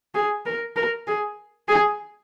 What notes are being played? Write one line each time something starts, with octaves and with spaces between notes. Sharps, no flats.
G#4
A#4
A#4
G#4
G#4